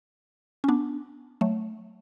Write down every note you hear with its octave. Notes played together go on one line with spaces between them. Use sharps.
C#4
B3 D4
F#3 A3